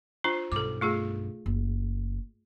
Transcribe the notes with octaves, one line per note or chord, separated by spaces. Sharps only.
D4 F4 C5
B1 G2 A4 D6
A3 F4 G#4
F#1